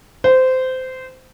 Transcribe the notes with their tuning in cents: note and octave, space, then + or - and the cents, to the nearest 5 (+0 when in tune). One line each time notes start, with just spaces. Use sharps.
C5 -20